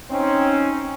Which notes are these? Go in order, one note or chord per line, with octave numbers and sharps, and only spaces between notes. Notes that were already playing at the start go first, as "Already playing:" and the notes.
C4 C#4 D#4